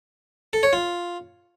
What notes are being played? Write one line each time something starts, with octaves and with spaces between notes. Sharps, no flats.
A4
C#5
F4